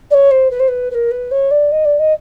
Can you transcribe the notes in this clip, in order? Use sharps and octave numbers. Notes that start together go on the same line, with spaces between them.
D5
C#5
C5
B4
C5
B4
B4
A#4
B4
C#5
D5
D#5
D5
D#5